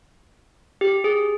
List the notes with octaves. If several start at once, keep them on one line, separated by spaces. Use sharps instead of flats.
G4
G#4